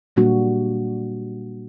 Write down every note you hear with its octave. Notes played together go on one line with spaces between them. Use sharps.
A#2 G3 A#3 D4 F#4